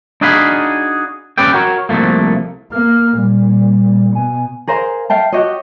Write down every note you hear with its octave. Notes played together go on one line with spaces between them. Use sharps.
D4 D#4 F#4 G#4 F5 B5
C#4 G4 B4 D5 G5
F#4 A#4 C#5
C2 F#2 F3 A3 A#3
A#3 F6
A#2 G3
B2 G#5
G#4 A#4 C5 F5
E5 F5 G5 A5
F#4 G4 C#5 D#5